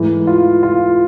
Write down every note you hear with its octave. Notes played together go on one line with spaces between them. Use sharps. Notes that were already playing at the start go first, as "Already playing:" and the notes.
Already playing: G#2 E3 A3
F4
F4